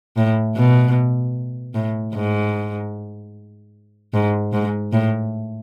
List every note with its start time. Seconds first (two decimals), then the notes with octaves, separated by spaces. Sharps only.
0.17 A2
0.56 B2
1.75 A2
2.15 G#2
4.14 G#2
4.53 G#2
4.93 A2